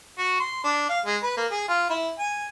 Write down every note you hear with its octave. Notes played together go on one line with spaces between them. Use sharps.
F#4
C6
D4
F5
G#3
B4
A#3
G#4
F4
E4
G#5